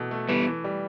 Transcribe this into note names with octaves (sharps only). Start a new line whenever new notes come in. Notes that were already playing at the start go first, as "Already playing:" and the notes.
Already playing: B2 E3 A4
A3
E3 G3 B3
E3
G3